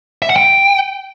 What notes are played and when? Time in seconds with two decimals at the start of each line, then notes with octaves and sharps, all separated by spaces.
0.22 E5
0.29 F#5
0.36 G5